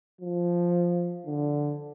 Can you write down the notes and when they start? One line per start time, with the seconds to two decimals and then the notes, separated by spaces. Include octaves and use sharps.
0.21 F3
1.27 D3